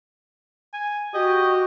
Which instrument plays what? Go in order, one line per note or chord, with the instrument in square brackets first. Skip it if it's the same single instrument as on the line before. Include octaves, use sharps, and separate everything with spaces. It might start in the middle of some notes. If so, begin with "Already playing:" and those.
[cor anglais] G#5
[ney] F#4 [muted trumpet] G4 [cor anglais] D#5